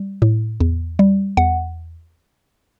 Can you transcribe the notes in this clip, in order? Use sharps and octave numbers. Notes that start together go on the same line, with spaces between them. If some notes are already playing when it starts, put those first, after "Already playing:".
Already playing: G3
A2
E2
G3
E2 F#5